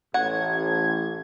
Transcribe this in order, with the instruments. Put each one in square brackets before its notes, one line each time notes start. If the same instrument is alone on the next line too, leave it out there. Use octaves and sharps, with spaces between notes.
[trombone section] A1 [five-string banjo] F#5 [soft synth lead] G#6